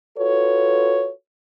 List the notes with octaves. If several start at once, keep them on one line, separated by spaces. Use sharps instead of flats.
F4 F#4 A4 B4 C#5